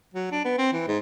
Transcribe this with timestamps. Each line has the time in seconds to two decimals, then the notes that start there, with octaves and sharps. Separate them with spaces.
0.14 F#3
0.32 D4
0.45 B3
0.58 C4
0.73 E3
0.88 G#2